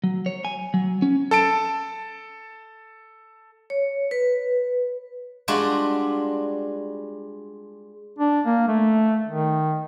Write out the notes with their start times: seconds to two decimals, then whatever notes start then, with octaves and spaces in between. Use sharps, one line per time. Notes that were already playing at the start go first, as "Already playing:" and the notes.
0.04 F#3
0.26 C#5
0.45 G#5
0.74 F#3
1.02 C#4
1.31 A4 A5 D7
3.70 C#5
4.11 B4
5.48 G3 G#3 D4 F4 F#4
8.19 D4
8.46 A#3
8.68 A3
9.27 D#3